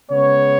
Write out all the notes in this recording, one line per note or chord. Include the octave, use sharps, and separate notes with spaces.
C#3 G#3 B3 C#5